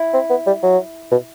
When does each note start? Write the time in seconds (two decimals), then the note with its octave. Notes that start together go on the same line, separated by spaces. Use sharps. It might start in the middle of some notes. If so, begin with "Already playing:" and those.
Already playing: E4
0.14 C4
0.30 B3
0.47 G3
0.63 F#3
1.11 B2